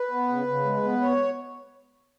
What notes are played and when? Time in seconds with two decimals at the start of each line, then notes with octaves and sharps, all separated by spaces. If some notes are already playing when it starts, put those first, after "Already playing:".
Already playing: B4
0.11 B3
0.29 C#3
0.47 C#3
0.65 G#3
0.83 B3
1.01 C#5